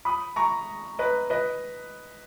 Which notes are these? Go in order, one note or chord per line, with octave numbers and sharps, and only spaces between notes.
B5 D#6
A#5 C#6
B4 D#5
B4 D#5